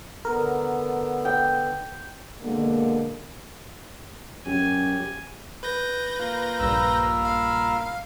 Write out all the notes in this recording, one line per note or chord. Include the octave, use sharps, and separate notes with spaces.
D3 B3 A#4
G5
B2 D3 G#3 A#3
F#2 F#3 G4 G#5
B4 G6 A#6
A#3 F4
A#1 G2 A#5 B5 E6
F5